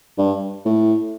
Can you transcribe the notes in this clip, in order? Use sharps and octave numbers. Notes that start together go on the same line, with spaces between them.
G2
A2